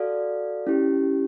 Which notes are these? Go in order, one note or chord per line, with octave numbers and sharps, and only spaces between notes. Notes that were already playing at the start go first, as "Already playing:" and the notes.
Already playing: F#4 A4 D5 F5
C#4 E4 G4